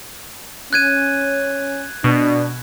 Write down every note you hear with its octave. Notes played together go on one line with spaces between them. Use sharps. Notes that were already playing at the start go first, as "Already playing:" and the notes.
C#4 F#6 G#6 D#7
B2 D4